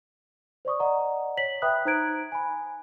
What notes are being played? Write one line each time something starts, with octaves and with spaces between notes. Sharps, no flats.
C5 D5 C#6 D#6
D5 D#5 F#5 A#5
C#5 B6 F#7
B4 E5 G5 B5 D#6 F#6
D#4 C5 A#5 F#6 G#6 D7
G#5 B5